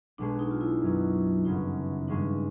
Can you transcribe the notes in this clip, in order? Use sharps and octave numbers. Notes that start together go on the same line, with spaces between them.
B1 B2 G#3 D4
D#4
F4
E4
F#2 D#3 F#3 B3
G1 F#2 C#3 D#4
G2 D#3 G#3 C#4 D4